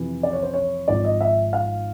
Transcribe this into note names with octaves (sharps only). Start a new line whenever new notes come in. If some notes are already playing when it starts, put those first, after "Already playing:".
Already playing: F2 C3 E3
D5
C#5
C5
C#5
G#1 G#2 F3 D5
D#5
E5
F5